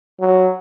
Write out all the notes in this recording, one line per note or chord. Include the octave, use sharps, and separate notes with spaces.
F#3